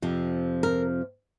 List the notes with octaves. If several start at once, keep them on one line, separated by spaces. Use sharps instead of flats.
F2 C3 F3
A#4